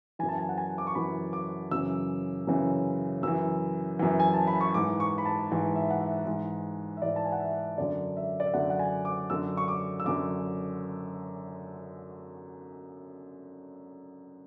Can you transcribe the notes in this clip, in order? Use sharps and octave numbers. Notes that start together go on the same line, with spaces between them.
F#2 E3 G#5
A5
G#5
F#5
G#5
D6
C#6
F#2 E3 B5
D6
F#2 C#3 E3 E6
F#2 C#3 E3
F#2 E3 E6
F#2 E3
G#5
A5
B5
C#6
G#2 E3 D6
C#6
B5
A5
G#2 E3
E5
F#5
E5
G#2 E3
E5
G#2 E3 D5
A5
G#5
F#5
E5
F#2 D3 D5
E5
D5
E5
F#2 D3 F#5
F#5
G#5
D6
F#2 D3 E6
C#6
D6
E6
F#2 D3 D6